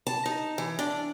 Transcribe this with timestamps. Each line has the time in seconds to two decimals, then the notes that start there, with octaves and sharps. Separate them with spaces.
0.07 A5
0.26 D#4
0.58 E3
0.79 D4